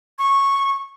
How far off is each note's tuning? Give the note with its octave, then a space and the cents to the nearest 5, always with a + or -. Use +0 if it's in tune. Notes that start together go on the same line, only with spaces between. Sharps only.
C#6 -10